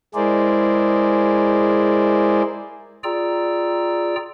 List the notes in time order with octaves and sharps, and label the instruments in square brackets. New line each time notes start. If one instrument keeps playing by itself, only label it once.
[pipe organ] G#3 E4 G#4 A#4 C5 D5
F4 G#4 D5 G5 A#5 E6